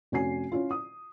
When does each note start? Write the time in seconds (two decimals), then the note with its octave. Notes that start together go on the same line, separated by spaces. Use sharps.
0.12 F1 C#4 F#4 G#5 C7
0.52 C#4 E4 F4
0.71 D#6